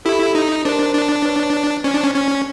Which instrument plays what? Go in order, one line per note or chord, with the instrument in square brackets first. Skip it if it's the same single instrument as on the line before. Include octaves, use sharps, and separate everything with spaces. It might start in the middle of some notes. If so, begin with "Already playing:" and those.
[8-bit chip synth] E4 [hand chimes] G4 A4
[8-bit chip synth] D#4
[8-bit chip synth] D4 [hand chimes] A#4 C5
[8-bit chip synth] D4
[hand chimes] B4 C#5
[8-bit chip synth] C#4 [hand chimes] C5 D5
[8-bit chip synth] D4
C#4
C#4